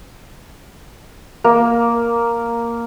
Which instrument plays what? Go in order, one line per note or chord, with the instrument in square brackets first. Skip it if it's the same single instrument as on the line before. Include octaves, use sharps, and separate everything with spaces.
[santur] A#3